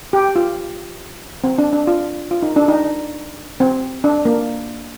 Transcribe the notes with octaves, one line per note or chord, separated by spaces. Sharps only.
G4
F4
C4
D4
D4
F4
F4
D#4
D4
D#4
C4
D4
A#3